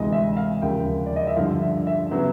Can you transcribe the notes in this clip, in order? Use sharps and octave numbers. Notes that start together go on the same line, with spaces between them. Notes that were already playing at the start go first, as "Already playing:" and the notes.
Already playing: D2 C3 E3 G#3 C4 D#5
E5
F5
D#2 C#3 F3 A#3 G5
D5
D#5
E5
G2 D3 F3 F5
E5
E5
C#3 F#3 B3